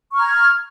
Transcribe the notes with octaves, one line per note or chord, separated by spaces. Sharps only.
A#5 C#6 F6 G#6